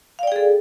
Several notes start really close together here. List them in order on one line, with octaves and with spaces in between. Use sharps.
F5 D5 G5 G#4 A4